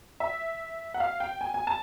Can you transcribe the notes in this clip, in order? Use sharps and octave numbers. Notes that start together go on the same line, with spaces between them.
E5
F#5
F5
G5
G#5
G#5
A5